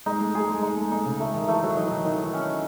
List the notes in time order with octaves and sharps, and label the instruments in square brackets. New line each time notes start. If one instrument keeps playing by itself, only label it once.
[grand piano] G#3 [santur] D#4
[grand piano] A3
[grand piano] G#3 [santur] G#4
[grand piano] G#3
[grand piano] G#3 [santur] D#4
[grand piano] A3
[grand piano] A3 [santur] D#4
[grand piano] C#3
[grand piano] G#3 [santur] A3
[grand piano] D#3
[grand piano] E3 [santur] A3
[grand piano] F#3
[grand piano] E3 [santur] D#5
[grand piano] D#3
[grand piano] D#3 [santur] D#5
[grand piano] E3
[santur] C#4